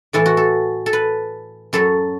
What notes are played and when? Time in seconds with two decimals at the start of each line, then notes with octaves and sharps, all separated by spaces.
0.13 A2 E3 A4
0.26 F#4
0.37 A4
0.86 A4
0.93 B4
1.73 F#2 F#3 A4